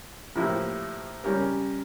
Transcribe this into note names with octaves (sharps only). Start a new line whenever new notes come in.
A2 F3 A#3 E4 G4
C#3 G3 C#4 G4 A#4